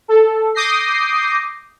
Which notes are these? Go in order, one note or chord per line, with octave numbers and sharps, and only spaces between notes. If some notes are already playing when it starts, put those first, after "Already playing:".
A4
D6 D#6 G6 A#6 C7